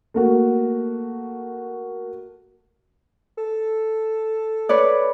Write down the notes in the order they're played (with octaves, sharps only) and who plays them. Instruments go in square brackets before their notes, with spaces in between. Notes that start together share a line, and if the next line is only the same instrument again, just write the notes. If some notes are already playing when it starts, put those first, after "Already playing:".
[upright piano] A3 A#3 F#4
[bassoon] A4
[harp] B4 C#5 D5